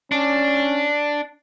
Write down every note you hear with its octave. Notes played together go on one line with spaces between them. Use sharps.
C#4 D4